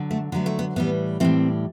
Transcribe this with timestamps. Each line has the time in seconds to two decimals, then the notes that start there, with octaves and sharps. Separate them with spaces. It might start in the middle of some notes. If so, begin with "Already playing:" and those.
Already playing: D3 F#3
0.11 A3
0.32 D3 F#3 A3 B3
0.46 A3
0.59 B3
0.76 A2 E3 G3 B3
1.20 A2 E3 G3 A3 C4